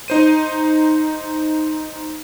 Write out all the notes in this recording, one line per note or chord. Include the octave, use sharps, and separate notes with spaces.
D#4 C5 D#7